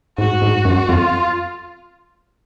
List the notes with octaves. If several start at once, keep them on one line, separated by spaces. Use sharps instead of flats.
G#2 F#4
G#2
F#2
F2 F4